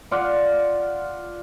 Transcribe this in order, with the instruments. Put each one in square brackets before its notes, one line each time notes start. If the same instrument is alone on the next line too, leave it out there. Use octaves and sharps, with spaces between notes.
[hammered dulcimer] F4 D5 F5 F#5